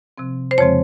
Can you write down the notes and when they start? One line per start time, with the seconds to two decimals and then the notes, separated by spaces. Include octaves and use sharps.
0.18 C3 F3 C4
0.51 C5
0.58 F2 C#3 F3 G#3 C4 C#5